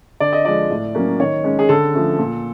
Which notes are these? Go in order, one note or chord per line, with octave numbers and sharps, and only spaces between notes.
D3 D5
D#5
F3 G#3 D5
A2
F#3 A#3 C#4
D#3 C#5
G#3 C#4
G#4
D3 A4
F3 A3 C#4
A#2